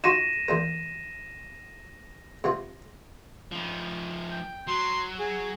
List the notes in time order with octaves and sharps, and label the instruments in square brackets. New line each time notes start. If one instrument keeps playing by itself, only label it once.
[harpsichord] D#4 F4 F#4 [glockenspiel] A#6 D#7 E7
[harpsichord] E2 A#2 A#4
C3 B3 F4
[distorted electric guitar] F3 D#4
[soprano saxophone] G5
[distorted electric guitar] F#3 [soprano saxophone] C6
[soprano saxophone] G#4